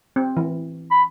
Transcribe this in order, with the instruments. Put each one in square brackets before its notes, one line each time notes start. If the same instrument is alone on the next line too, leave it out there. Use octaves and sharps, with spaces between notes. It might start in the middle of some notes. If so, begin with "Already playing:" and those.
[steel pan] C4
E3
[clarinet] B5